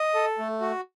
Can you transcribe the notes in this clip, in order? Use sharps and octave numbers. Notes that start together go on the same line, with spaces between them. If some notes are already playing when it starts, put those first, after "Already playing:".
Already playing: D#5
A4
A3
F#4